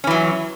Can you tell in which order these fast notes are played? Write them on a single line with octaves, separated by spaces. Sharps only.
C#4 E3 F#3